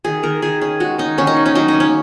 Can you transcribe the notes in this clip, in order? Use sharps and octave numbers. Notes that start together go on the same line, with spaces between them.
D#3 G#4
D#3 A#4
D#3 G#4
C#4 G#4
G#3 F#4
C#4 D#4
D#3 C#4
D#4
D#3
C#4
F#3 D#4
D#4
A#3
C#4